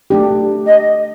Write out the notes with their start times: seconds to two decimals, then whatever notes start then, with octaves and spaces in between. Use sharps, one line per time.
0.10 A3 D4 G4
0.66 D#5